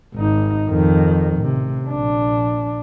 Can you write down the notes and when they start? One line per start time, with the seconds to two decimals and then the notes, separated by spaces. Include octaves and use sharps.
0.14 G#1 D#4
0.69 F2 D#3
1.37 A1 C3
1.89 A#1 D4